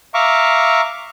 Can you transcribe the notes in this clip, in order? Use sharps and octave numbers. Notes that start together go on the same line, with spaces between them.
E5 F5 A#5 C#6 D6